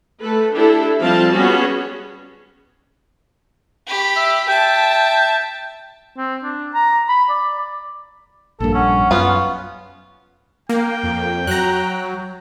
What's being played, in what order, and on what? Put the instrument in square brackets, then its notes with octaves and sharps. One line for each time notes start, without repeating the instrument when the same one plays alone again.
[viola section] A3 A4 B4
D4 E4 G4 A4
F3 G3 C4 C5 F5 A5
G3 B3 C#4 F#4 G#4
[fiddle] G4 B5
[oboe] E5
[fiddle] E5 A5 [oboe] G5
[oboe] C4
D4
A#5
B5
D5
[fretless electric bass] A#1 G2 [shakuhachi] A#3 [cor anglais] A4
[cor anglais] C#4 [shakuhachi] F#5
[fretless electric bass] F#2 [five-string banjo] B3 F4 [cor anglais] C#4
[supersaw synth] A#3 [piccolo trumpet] G5
[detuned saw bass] F2
[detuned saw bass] F#3 [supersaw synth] A#5 F#6